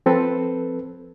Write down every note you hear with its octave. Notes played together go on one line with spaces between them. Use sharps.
F3 C4 A4 B4